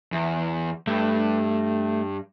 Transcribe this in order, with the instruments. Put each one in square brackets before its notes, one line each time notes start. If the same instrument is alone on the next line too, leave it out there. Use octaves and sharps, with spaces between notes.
[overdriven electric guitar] E2
[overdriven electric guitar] G2 [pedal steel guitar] A3